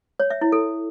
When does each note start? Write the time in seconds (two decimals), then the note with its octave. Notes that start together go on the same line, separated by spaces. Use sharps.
0.20 C#5
0.30 E5
0.41 E4
0.52 A4